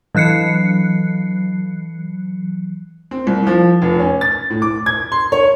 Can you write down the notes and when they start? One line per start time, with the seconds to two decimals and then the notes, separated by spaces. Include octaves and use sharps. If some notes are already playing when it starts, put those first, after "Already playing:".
0.15 E3 F#3 F#6 C7 C#7
3.11 C4
3.27 C2
3.47 F3
3.82 F1
3.99 C#4
4.21 A6
4.50 A2
4.62 D6
4.86 G#6
5.12 C6
5.32 C#5